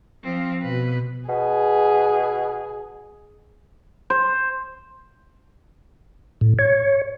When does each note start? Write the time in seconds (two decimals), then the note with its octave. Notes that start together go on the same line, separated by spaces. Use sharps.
0.24 F3 C4 F5
0.62 B2 B4
1.29 B2 G#4
4.10 C5
6.41 A2
6.59 C#5